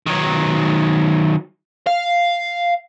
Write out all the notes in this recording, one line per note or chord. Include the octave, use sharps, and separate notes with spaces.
D#3 F#3
F5